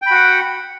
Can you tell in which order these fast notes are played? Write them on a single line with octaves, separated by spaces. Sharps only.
G5 B5 F#4 F#5